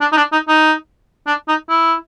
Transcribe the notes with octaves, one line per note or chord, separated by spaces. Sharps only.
D4
D#4
D4
D#4
D#4
D4
D#4
E4